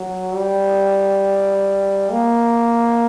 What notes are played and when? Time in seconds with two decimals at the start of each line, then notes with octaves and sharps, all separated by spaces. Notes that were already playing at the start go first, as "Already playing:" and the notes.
Already playing: F#3
0.32 G3
2.11 A#3